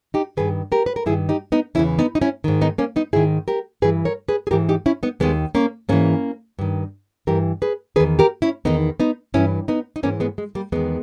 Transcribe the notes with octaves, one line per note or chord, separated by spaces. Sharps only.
D#4 G4
G2 D#3 G#4 B4
G4 A#4
B4
A#4
G2 D#3 E4 G#4
D#4 G4
B3 D#4
E2 C#3 E3 C#4 E4
B3 D#4
D#4
C#4 E4
G#2 D#3
B3 D#4
A#3 C#4
B3 D#4
G#2 D#3 E4 G#4
G4 A#4
G2 E3 G#4 B4
A#4 C#5
G#4 B4
G#4
G#2 E3 G4 A#4
D#4 G4
C#4 E4
B3 D#4
D#2 D#3 G#3 B3
A#3 C#4
G#2 E3 A#3 C#4
G2 D#3
G2 E3 G4 A#4
G#4 B4
E2 D#3 G#4 B4
G4 A#4
C#4 E4
E2 D#3 B3 D#4
B3 D#4
G2 E3 C#4 E4
B3 D#4
D#4
G#2 E3 A#3 C#4
G#3 B3
G#3
G3 A#3
E2 D#3 G#3 B3